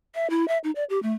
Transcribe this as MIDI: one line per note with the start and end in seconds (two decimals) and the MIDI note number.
0.15 0.27 76
0.30 0.47 64
0.48 0.58 76
0.64 0.71 63
0.75 0.84 74
0.90 1.01 67
1.03 1.13 57